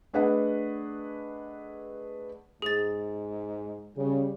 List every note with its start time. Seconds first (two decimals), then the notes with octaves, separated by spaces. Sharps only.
0.14 A3 D4 G#4 B4 D#5 F#5
2.62 G#2 G#4 A6
3.96 C#3 G3